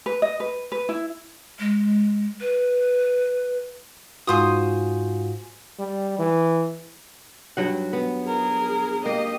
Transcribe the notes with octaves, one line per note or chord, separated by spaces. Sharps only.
B4
D#5
B4
B4
E4
G#3
B4
G#2 F4 F#4 G#4 C5 D#6
G3
E3
G2 F#3 F#5
B3
G#4 A#4
A#3 G4 D#5